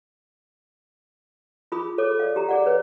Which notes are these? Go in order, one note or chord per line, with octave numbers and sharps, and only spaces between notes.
F4 G#4 B5 D#6
G#4 A4 C#5 D6
D5 F5
G4 A#5
G#4 D5 F#5
B4 C#5